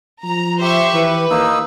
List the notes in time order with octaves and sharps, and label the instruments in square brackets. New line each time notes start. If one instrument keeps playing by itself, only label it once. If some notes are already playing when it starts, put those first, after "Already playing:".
[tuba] F3 [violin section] A#5
[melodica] G4 [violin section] C5 E5 C#6
[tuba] E3 [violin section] B4
[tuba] D#2 [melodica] A#3 D#4 E6